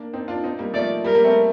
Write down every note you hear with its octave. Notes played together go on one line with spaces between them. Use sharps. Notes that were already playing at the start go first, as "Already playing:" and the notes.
Already playing: A#3 D4
C4 D#4
D4 F4
C4 D#4
G3 A#3
F3 A3 D5
G3 A#4
G3 A#3
A3 C4